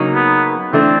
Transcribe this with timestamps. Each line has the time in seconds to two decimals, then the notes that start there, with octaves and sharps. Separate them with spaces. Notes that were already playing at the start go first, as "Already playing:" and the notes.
Already playing: C#3 F#3 A#3 D#4
0.15 B3
0.73 E3 A3 C4 D4